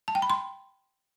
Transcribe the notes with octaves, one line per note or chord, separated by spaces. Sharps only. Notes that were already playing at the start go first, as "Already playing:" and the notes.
A5
G5
B5
C6